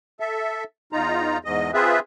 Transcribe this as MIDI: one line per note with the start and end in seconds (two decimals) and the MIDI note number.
0.20 0.64 69
0.20 0.64 76
0.93 1.38 40
0.93 1.38 63
0.93 1.38 65
0.93 1.38 82
1.45 1.71 40
1.45 1.71 44
1.45 1.71 75
1.74 1.99 60
1.74 1.99 65
1.74 1.99 68
1.74 1.99 71
1.74 1.99 76